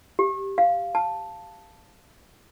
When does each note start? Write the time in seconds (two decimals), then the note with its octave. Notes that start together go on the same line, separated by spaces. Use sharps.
0.19 G4
0.58 F5
0.95 A5